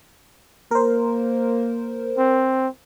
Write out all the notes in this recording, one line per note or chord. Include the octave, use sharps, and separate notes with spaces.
A#3 A#4 C5
C4